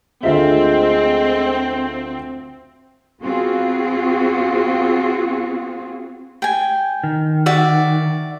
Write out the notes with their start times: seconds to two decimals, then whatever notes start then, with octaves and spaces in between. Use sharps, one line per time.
0.23 D2 G#3 C4 F4 E5
3.22 B3 C4 F4 F#4 G#4
6.42 G5 G#5
7.04 D#3
7.46 F#4 D5 E5